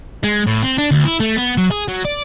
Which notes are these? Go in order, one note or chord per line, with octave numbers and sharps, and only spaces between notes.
G#3
A2
C4
D4
D2
E4
A3
B3
F#3
G#4
F#3
D5